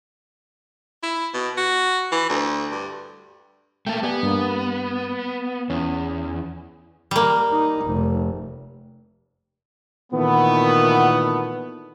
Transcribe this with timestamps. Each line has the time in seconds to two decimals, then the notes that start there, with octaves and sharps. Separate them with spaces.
1.03 E4
1.34 B2
1.57 F#4
2.12 E3
2.29 D2
2.71 G2
3.86 A3 A#3 G5 A5
4.03 B3 G4 D5 G#5
4.23 G2 A#3
5.70 E2 C#4
7.11 G3 A#3
7.52 D#4
7.86 F1
10.12 A#2 D#3 E3 A3 B3